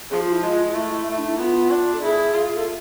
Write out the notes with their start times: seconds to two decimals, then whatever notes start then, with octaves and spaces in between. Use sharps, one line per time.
0.11 F3 G#4
0.21 F4
0.32 E4
0.43 G#3 F4
0.67 F4
0.74 A3 E4
1.06 A3
1.18 D4
1.28 E4
1.38 B3 F4
1.70 D4
1.94 A4
2.02 E4 G#4
2.34 F4
2.56 A4